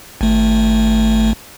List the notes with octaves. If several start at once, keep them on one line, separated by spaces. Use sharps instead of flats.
G#1 A3